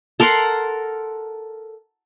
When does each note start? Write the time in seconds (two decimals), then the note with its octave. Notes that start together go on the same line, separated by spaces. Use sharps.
0.20 A4 A#4 F#5 C6